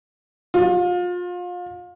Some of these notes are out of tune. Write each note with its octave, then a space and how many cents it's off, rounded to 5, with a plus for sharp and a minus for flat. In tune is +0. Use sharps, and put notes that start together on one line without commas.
F4 +30